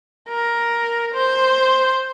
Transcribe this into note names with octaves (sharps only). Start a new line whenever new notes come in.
A#4
C5